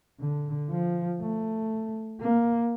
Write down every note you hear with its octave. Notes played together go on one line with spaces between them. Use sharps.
D3
F3
A3
A#3